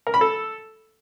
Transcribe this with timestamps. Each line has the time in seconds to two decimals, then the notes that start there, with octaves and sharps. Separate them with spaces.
0.07 A#4
0.14 B5
0.21 A4